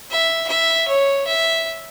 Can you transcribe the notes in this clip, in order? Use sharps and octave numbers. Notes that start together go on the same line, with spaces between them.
E5
E5
C#5
E5